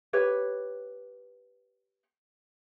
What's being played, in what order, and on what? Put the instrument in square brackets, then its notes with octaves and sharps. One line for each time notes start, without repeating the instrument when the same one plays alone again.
[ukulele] G4 B4 C#5